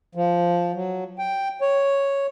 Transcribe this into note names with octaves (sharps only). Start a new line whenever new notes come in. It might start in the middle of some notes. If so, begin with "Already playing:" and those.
F3
F#3
G5
C#5